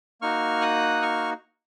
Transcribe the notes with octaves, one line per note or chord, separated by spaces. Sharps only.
A#3 D#4 F#4 C#6 F6
D#6 F#6
C#6 F6